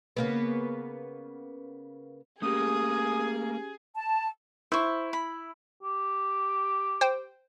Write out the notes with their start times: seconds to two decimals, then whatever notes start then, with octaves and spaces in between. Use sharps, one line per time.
0.17 C#3 A#3 B3
2.42 A3 A#3 C#4 G4 G#4 D#6
3.96 A5
4.72 E4 C5 C#6
5.13 B5
5.83 G4
7.01 C5 G5